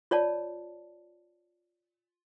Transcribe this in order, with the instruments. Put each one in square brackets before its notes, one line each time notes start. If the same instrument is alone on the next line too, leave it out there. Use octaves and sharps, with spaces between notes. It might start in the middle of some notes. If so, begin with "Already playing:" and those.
[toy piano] F4 C#5 D5 A5